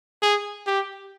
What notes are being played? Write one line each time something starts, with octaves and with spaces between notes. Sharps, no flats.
G#4
G4